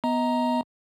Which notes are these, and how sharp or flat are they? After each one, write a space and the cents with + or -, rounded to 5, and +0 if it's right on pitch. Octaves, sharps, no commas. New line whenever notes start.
B3 +0 D#5 +30 A#5 +0